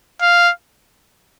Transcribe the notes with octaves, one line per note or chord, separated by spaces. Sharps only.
F5